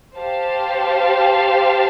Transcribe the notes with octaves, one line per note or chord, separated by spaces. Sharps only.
G4 C5 F5 A5